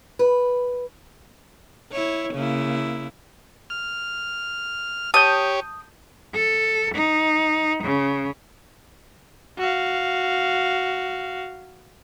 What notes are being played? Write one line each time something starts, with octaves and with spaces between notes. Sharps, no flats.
B4
E4 C#5
C#3 A#3 E4
F6
G4 C#5 A5 D#6 G6
A4
D#4
C#3
F#4 F5